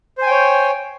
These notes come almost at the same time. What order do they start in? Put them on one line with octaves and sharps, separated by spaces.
C5 G#5 G5 C#5